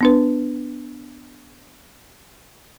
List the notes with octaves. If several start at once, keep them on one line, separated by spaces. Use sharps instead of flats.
B3 D4 B4